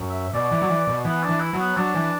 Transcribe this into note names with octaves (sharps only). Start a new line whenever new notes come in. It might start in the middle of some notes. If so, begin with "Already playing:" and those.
Already playing: F#2
E5
B2 D5
E3
F#3
E3
B2
E3 B3
D4
E3
E4
F#3
B3
F#3 D4
E3